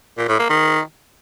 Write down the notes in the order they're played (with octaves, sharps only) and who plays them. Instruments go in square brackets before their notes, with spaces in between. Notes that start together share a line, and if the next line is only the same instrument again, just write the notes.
[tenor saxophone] A#2
A2
A#3
D#3